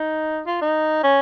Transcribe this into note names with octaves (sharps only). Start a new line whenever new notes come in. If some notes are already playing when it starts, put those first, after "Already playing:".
Already playing: D#4
F4
D#4
C#4